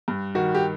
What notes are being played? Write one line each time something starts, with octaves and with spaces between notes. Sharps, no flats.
G2
D#3 F#4
G4